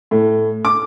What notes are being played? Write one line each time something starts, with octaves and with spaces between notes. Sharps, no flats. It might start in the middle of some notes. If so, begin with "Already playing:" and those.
A2
D6